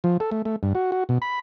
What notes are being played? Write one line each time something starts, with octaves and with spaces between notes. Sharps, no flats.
F3
A4
A3
A3
G2
F#4
F#4
B2
B5